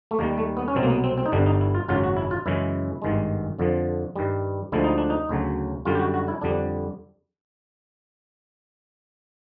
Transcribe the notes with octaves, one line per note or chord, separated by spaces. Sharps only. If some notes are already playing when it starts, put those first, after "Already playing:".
A3
D#2 D#3 G3 A#3
A3
B3
C#4
C2 B2 F#3 C4
A#3
B3
C4
C4
D#4
G1 G2 D3 G3 D4
D#4
E4
F4
G#1 F#2 C#3 F#3 F4
F#4
E4
F4
F#2 C#3 E3 G#3 E4
G#1 G2 D#3 G#3
F2 D3 F3
G2 D#3 G3
D2 D3 F3 G#3 E4
D#4
D4
D#4
D2 C#3 F#3
F#2 D3 G3 F4
G4
F#4
F#4
E4
F2 D3 G3 D4